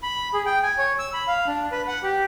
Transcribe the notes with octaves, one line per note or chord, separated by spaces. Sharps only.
B5
G#4
G5
G#5
C#5
E6
B5
F5
D4
B4
F#5
G4